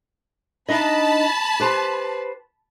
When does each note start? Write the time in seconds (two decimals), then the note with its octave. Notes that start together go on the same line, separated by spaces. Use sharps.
0.69 D4 D#4 D#5 A5 B5
1.60 G4 B4 C5